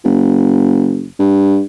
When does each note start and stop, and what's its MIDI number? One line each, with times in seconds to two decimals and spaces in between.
0.04 1.08 30
1.19 1.62 43